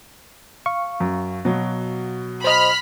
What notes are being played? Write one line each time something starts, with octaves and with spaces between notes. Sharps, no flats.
F5 C#6
F#2
B2 F#3
C5 D#5 B5 F6